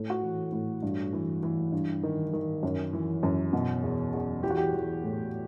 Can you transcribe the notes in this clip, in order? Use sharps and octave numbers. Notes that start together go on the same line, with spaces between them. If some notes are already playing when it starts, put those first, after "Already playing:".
Already playing: A2
F#4
E3
A2
G2
E3
E3
G2
D#3
D#3
F#2
E3
F#2
B2
E2
E2
E3 G4
F#4
G4
E3
A2